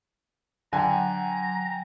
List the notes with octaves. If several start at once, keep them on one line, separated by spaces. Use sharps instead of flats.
D3 F#3 G5 G#5 A#5